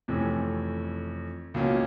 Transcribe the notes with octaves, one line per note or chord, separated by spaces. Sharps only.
F2 C3 E3 A3 C#4
C#2 B2 F#3 A#3 C#4